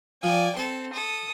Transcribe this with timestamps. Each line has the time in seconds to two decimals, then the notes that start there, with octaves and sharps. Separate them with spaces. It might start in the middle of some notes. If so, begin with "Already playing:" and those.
0.23 F3 D5 G5 G#5
0.57 C4 A4 C6
0.93 A4 D#6